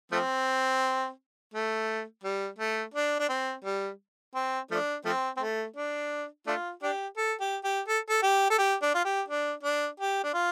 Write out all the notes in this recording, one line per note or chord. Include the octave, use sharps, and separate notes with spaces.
F3 A3 C4
A3
G3
A3
D4
D4
C4
G3
C4
F3 A3 D4
F3 A3 C4
C4
A3
D4
A3 D4 F4
D4 G4
A4
G4
G4
A4
A4
G4
A4
G4
D4
F4
G4
D4
D4
G4
D4
F4